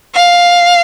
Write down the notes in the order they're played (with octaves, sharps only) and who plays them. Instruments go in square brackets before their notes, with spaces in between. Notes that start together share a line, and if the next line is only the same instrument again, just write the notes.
[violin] F5